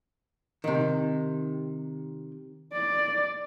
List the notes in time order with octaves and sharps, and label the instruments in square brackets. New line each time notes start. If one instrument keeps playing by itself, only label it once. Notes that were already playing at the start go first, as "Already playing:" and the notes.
[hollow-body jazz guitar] C3 D#3
[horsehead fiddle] D5